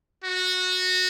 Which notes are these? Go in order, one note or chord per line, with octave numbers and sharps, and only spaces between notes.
F#4